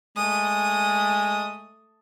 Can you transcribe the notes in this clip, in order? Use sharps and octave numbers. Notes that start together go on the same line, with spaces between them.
G#3 A3 D#6